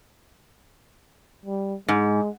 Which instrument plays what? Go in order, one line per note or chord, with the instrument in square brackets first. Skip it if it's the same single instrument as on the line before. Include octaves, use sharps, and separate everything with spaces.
[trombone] G3
[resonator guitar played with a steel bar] G#2 [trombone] G#3